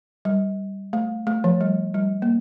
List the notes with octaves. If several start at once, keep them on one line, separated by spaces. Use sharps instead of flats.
G3
A3
A3
F3
G3
G3
A#3